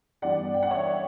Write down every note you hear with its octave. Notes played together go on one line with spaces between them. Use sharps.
G2 E3 G3 B3 D5 F#5
G5
F#5
C#5 E5